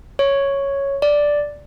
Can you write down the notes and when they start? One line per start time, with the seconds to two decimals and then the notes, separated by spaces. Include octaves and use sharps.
0.19 C#5
1.02 D5